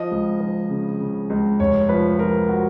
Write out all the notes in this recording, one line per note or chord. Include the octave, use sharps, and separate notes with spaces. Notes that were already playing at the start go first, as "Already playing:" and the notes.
Already playing: F3 D#5
C#2
F3
C#3
C#3
C#2
F1 C#5
F3 B4
F3 A#4
F#4